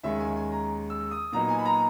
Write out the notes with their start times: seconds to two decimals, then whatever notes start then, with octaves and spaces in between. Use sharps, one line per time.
0.03 D#2 D#3 G#3 C#4 E5
0.19 G#5
0.36 G#5
0.52 A#5
0.90 E6
1.11 D#6
1.33 A#2 F#3 B3 D#4 A#5
1.49 G#5
1.59 B5
1.66 A#5